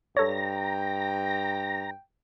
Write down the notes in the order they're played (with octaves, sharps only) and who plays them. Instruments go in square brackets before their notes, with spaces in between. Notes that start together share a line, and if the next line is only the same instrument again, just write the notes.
[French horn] G2 [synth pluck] A4 C#5 [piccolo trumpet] G5 [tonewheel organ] A#5